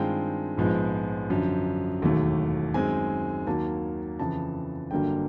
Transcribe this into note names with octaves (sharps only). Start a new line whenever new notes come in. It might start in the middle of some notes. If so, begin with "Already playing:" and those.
Already playing: G2 D#3 G#3 C4 F4 G5
A#1 G#2 F3 G#3 B3
F#2 D3 F3
E1 D#2 D#3 F#3 A3
F#2 D#3 G#3 C4 G#5
D#2 D#3 F#3 A#3 A5
F2 C#3 E3 A5
G1 G2 D3 F#3 A#3 G5